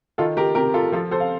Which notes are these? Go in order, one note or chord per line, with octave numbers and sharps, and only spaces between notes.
D#3 F4 A4
G4 A#4
C3 G4 A#4
F4 A4
F3 F4 A4
A4 C5
F5